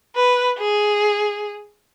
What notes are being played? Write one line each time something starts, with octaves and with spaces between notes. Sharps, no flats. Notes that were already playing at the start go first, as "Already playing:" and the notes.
B4
G#4